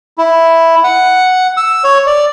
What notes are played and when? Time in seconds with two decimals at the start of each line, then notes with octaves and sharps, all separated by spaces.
0.18 E4
0.84 F#5
1.57 E6
1.84 C#5
2.06 D5